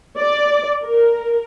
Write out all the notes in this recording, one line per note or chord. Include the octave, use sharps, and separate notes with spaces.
D5
A#4